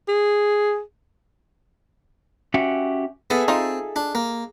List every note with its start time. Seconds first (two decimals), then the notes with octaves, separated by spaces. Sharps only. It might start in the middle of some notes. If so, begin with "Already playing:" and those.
0.08 G#4
2.54 C#4 F#4 G4 E5 F#5
3.30 B3 G#4 A4 E5
3.48 C4 D#4 F4
3.96 D4
4.15 A#3